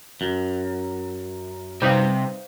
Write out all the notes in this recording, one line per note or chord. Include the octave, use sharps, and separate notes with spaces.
F#2
C3 G3 D#4 B4 C5 F5